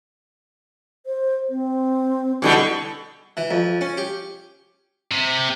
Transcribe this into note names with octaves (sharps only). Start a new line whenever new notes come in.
C5
C4
B2 D3 G3 E4
E3
F2
C#4
G4
C3